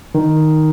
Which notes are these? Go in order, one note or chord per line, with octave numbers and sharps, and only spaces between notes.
D#3